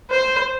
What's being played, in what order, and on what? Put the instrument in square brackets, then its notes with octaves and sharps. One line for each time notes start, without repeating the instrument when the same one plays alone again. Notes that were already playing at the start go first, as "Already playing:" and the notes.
[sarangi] C5